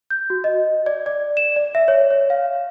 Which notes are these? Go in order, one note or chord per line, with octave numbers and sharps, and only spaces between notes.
G6
F#4
D#5
D5
D5
E7
D5
E5
C#5
C#5
F5